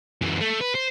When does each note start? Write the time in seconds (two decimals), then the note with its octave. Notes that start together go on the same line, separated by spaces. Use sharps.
0.22 F#2 E3
0.41 A3
0.61 B4
0.75 C5